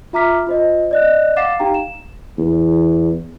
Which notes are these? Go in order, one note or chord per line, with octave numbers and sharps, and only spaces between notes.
F4 E5 A#5 D6 F6 B6
F4 C5 D#5
D5 D#5 F#6
F5 F#5 D6 A6 C7 E7
D#4 G4 F5 G5 A#5
E7
E2